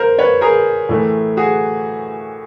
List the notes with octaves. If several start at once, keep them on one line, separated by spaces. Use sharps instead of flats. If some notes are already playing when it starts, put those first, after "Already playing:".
Already playing: A#4 C5
B4 C#5
G#4 A#4
A2 E3 A3
F#4 G#4